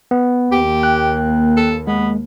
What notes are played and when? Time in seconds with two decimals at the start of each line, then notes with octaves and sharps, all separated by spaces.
0.11 B3
0.52 D#2 A#3 G4
0.83 G5 F#6
1.57 A4
1.87 G#3 B3